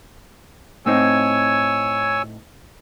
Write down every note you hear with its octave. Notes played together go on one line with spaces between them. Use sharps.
A2 C4 D#4 C#5 G#5 E6